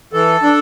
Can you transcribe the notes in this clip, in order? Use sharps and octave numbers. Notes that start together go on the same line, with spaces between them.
E3 A4
D4